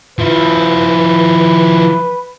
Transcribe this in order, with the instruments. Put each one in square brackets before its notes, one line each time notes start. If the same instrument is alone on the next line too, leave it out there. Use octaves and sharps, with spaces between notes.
[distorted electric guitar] F3 E4 [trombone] B4